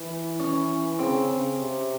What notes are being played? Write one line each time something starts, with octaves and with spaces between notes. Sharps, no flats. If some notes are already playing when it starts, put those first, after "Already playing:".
Already playing: E3
C#4
C#3 C4
C#3
C3